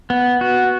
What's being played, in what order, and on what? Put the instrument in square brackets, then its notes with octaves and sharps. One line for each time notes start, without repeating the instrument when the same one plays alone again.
[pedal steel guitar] B3
F#4